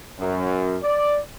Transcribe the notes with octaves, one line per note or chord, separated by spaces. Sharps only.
F#2
D5